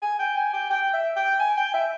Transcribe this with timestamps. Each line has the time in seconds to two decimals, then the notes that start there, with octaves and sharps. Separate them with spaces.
0.02 G#5
0.19 G5
0.36 G#5
0.53 G5
0.70 G5
0.93 E5
1.16 G5
1.39 G#5
1.57 G5
1.74 E5